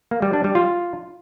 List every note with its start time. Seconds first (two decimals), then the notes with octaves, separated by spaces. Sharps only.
0.11 A#3
0.22 G3
0.33 D4
0.44 G3
0.55 F4